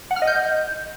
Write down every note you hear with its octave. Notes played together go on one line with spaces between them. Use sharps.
F#5
F6
D#5
G6